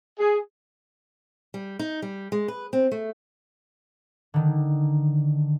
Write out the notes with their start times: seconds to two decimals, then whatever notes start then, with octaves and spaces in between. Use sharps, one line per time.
0.19 G#4
1.54 G3
1.79 D#4
2.02 G3
2.32 G#3
2.48 B4
2.73 C4
2.91 A3
4.34 D3 D#3